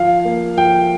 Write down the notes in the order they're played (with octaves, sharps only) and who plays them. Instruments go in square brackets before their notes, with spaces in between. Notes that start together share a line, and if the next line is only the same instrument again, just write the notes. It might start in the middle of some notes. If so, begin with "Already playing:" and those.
Already playing: [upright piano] F3 F5
A#3
F3 G5